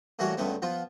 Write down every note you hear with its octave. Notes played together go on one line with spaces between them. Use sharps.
A2 E3 G3 A#3 F#4 C#5
C#2 G2 D3 G3 A3 B3
F3 B3 F4